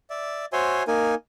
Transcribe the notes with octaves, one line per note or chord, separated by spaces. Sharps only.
D5 E5
F#4 C5 C#5 E5 G#5 C6
A#3 D#4 A#4 G#5